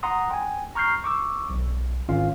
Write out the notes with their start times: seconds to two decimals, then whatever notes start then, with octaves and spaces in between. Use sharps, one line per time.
0.03 F#5 A#5 C6 D#6
0.31 G5 G#5
0.75 A#5 C#6 F6 G6 C7
1.04 C#6 D6 E6
1.50 B1
2.09 G#1 C#4 F4 F5